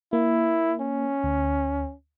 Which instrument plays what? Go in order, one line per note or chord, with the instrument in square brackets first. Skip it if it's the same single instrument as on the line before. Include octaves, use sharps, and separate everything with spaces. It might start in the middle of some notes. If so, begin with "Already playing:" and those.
[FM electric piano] A#3 [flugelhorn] E4
[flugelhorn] C#4
[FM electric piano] D2